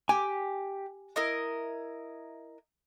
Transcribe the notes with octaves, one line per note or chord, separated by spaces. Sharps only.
G4 G#5
E4 A#4 D#5